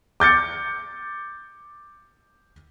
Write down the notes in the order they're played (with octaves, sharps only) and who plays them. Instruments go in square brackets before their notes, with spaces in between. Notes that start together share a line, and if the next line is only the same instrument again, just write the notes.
[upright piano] D6 G6 A6 C#7